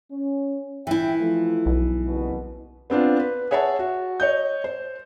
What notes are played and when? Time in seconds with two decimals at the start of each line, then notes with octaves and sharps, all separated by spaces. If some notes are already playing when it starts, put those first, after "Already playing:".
0.11 C#4
0.87 A#1 E3 E4 E5 G5
1.21 F3 A3
1.66 B1
2.07 F#1 C2 B2
2.90 B3 C4 D4 F4
3.20 B4
3.51 G#4 C#5 E5 F#5 A5
3.79 F#4
4.20 C#5 D#5 G6
4.64 C5